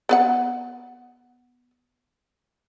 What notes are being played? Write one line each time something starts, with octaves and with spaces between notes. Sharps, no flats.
B3 B4 F#5